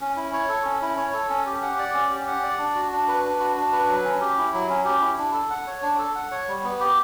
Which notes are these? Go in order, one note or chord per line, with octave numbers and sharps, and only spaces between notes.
C#4
E4
C#5
A4
C#4
E4
C#5
A4
C#4
G4
F#5
D5
C#4
G4
F#5
D5
D4
F#4
D4
B4
D4
F#4
D4
B4
F#3
C#4
G4
E4
F#3
C#4
G4
E4
D4
A4
F#5
C#5
D4
A4
F#5
C#5
G3
B3
G4